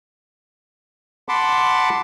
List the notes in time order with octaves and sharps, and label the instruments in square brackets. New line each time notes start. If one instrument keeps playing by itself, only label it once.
[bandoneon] F#5 A5 B5 C6 D6